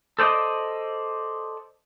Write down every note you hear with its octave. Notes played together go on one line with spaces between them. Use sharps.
A4 C5 D5 D#5